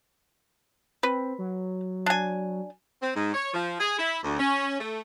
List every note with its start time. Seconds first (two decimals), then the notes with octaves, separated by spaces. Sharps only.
1.03 C4 B4
1.39 F#3
2.06 D4 G#5
3.02 C4
3.16 G#2
3.34 C#5
3.54 F3
3.80 G#4
3.99 E4
4.23 D2
4.39 C#4
4.80 A3